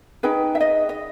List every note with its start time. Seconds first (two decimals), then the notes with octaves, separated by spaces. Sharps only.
0.23 D#4 G#4 B4 G5
0.55 E5
0.60 D#5
0.89 D#5